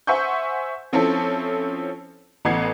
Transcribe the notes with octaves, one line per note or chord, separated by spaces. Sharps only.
C5 E5 F#5 G#5 C#6 G6
F3 C4 C#4 E4 A4
A1 E3 B3 G#6 C7